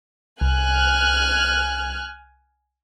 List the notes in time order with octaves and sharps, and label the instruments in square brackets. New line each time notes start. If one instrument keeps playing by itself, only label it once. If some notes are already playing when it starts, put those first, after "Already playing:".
[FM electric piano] C2 [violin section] G#5 F6 F#6